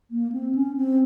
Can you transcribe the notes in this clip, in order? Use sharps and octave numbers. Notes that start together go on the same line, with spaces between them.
A#3
C4
C#4
C4